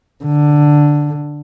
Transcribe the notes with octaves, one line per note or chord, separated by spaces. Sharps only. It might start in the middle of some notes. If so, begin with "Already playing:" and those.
D3